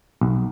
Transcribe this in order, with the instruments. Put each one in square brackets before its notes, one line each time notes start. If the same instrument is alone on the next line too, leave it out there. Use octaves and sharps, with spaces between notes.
[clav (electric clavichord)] B1